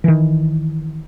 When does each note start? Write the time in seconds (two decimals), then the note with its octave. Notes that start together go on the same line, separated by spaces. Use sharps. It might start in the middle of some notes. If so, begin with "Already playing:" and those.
0.04 D#3 E3